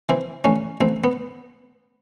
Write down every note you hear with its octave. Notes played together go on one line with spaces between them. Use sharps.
E3 C4
A1 C#4
A1 C4
B3